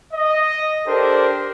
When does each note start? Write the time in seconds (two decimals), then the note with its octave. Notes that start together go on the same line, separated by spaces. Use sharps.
0.14 D#5
0.88 D4 G4 A4 A#4 C5